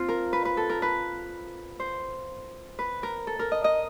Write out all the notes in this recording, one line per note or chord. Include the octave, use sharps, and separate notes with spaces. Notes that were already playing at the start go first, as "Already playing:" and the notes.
Already playing: C4 F4
A#4
B4
B4
A4
A#4
B4
C5
B4
A#4
A4
A#4
D#5
D#5